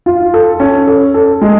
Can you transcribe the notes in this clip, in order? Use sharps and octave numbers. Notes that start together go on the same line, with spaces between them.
F4
A4
C#4
A4
A4
G#3